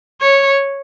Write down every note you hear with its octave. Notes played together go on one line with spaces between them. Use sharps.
C#5